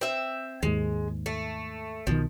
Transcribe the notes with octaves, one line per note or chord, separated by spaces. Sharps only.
C4 E5
D#2 G#2 G#3
A3
B1 B2 D#3 F3